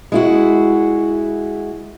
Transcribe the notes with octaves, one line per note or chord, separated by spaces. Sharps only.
G#3 E4 F#4